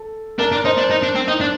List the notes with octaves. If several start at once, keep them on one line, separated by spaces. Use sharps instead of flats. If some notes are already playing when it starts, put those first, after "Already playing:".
Already playing: A4
D4 A#4
D4
D#4 C5
D4
D#4
D4
C4
D#4
D4